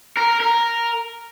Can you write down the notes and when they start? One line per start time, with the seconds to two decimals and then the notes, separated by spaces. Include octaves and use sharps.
0.17 A#4
0.40 A#4